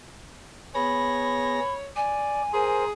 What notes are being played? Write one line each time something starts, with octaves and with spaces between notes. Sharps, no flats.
B3 G#4 C#5 B5 A#6
D5 G#5
G#4 A#4 C5